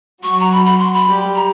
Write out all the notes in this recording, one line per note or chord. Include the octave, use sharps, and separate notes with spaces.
F#3 F#4 C#6
A#5
B5
B5
C6
B5
G3 G4
A#5